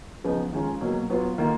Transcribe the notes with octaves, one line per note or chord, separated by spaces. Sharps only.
C#3 F3 B3 D#4
D#3 G#3 C#4 F4
B2 F#3 A#3
F#3 B3 F4
D#3 A#3 F4